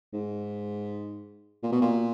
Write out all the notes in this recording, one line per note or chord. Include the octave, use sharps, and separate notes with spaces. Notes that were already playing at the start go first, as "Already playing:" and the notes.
G#2
A#2
B2
A#2